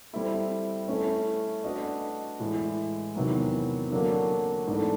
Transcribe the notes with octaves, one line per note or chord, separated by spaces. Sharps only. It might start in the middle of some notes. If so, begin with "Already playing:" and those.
G3 C4 E4 A4
A3 C#4 E4
A3 D4 F#4 B4 D#5
A2 E3 G#3
E2 C3 D#3 F#3 B3
D3 F#3 A#3 D4 F#4
G#2 E3 A3 D4